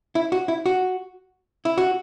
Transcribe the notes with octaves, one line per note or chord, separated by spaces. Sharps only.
E4
F#4
E4
F#4
E4
F#4